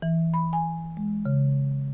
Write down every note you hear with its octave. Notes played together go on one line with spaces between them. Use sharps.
E3
B5
G#5
G#3
C#3